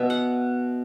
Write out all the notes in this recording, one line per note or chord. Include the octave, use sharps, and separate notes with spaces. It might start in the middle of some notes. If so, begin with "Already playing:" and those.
Already playing: B2 B3 E5
F#5